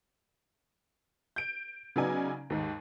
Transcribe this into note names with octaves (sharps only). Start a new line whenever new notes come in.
G6 D7
C#3 F#3 B3 D#4 D5 G#5
D#2 G#2